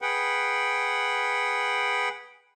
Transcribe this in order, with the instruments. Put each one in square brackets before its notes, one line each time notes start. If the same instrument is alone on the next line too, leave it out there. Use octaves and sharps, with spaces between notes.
[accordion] G#4 B4 F#5 G5